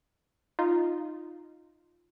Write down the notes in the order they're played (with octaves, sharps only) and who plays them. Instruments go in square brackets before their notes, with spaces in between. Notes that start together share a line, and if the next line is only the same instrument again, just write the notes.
[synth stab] D#4 F4